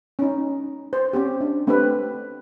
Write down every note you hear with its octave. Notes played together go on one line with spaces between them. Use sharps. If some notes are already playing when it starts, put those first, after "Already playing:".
C#4 D#4
C5
C4 C#4 G4
D4
A3 C4 D4 G4 B4